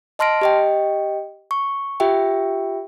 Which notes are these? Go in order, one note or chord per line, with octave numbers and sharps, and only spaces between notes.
D#5 A5 C6 F6 A#6 D7
G4 D#5 G5
C#6
F4 G4 E5 G5